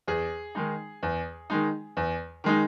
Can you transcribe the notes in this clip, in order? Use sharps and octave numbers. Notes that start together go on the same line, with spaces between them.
E2 G#4
D#3 G#3 D#4
E2
D#3 G#3 D#4
E2
D#3 G#3 D#4